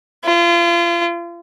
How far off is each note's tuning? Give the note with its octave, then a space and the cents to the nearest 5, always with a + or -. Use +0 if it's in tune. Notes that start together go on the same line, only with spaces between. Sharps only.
F4 -35